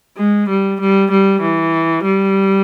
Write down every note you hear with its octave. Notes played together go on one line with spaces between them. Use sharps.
G#3
G3
G3
G3
E3
G3